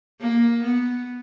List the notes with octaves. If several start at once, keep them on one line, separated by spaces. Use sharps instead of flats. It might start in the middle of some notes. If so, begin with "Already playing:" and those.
A#3
B3